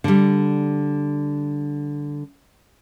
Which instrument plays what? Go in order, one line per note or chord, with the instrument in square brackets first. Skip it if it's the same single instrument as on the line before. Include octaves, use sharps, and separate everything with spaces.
[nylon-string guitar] D3 G3